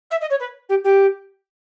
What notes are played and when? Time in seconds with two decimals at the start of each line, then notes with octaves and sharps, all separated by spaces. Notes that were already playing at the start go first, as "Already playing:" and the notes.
0.10 E5
0.21 D#5
0.30 C#5
0.39 B4
0.69 G4
0.84 G4